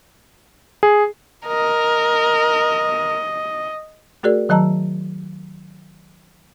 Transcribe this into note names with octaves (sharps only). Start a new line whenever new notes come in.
G#4
A#4 D#5
A3 F#4 G#4 A#4 D5
D#3 F#3 D#5 A5 A#5 E6